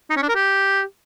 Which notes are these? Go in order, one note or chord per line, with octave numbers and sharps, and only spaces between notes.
D#4
C#4
D4
A#4
G4